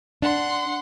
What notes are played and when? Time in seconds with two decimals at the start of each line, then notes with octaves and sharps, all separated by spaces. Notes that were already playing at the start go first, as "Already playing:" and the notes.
0.22 D4 F#5 C6